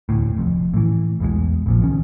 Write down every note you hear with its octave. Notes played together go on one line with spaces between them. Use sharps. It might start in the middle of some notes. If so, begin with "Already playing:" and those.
E1 D2 A2
F1 F2
A2 E3
B1 E2 B2 G#3
A#1 A#2 F3
C#2 D#3 C#4